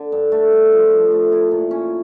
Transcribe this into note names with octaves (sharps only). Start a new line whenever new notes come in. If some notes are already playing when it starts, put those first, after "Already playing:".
Already playing: D3
G2
A3
G2
F3
F3
A3
E4
A#2
C#4